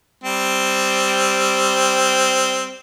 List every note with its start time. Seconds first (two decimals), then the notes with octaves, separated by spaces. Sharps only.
0.24 G3 C4